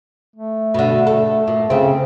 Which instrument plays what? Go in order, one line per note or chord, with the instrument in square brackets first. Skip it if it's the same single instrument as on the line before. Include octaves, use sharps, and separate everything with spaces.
[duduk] A3
[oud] B2 D3
A4
A#2
[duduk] C#3 [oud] A3 C4